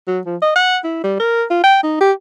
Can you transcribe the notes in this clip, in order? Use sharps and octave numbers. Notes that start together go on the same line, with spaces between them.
F#3
F3
D#5
F#5
E4
G3
A#4
F4
G5
D#4
G4